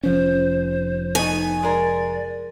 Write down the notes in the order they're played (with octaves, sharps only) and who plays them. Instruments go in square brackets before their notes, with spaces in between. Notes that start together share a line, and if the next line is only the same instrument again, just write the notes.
[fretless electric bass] F1 F3 C#4 [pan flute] C5
[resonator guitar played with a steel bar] A3 B3 D#4 [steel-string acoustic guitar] G#5
[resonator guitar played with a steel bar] G#3 A#4 [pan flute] D5